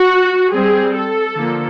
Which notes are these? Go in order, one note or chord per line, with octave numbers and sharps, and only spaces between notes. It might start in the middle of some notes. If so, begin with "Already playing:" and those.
Already playing: F#4
G3 C4 G#4
A4
D3 F3 A#3